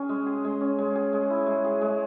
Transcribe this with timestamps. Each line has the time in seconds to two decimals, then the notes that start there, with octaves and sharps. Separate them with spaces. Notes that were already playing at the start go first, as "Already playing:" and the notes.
Already playing: C#4 G#4
0.09 G#3
0.26 G#4
0.45 G#3
0.61 C#4
0.79 G#3
0.95 G#4
1.13 G#3
1.30 E4
1.46 G#3
1.64 G#4
1.81 G#3